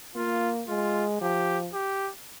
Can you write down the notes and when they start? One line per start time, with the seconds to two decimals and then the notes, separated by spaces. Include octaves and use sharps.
0.15 A#3 F4
0.68 G#3 F4
1.21 F3 G4
1.74 G4